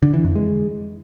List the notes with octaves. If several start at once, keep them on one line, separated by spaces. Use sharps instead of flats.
D3
E3
F2
G#3